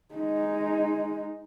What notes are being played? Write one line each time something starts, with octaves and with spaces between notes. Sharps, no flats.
G#3 D#4